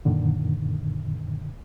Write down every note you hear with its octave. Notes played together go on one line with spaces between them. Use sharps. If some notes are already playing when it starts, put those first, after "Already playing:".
F#2 A#2 D3 D#3